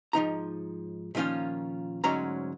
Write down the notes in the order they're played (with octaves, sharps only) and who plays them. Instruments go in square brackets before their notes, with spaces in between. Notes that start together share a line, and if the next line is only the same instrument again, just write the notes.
[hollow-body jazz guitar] G#2 F3 D#4 A#5
A#2 D#3 F3 C#4 F4
D2 G#2 F#3 C#4 A#5